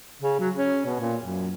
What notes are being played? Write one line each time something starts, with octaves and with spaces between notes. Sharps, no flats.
C#3
F#3
C#4
B2
A#2
F#2